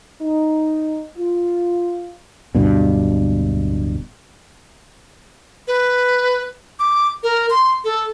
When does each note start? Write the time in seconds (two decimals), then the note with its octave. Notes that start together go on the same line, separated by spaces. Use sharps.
0.22 D#4
1.17 F4
2.55 D1 G2 B2
5.68 B4
6.79 D6
7.23 A#4
7.50 C6
7.84 A4